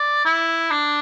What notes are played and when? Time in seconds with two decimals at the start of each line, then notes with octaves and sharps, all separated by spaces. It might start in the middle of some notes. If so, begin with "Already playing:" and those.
Already playing: D5
0.25 E4
0.71 D4